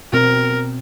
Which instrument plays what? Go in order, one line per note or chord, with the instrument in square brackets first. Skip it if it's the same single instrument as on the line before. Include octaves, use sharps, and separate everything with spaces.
[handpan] B2 C4 [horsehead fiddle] A#4